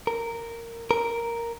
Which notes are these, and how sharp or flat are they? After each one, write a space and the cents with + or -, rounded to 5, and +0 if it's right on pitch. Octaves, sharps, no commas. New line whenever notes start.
A#4 -10
A#4 +0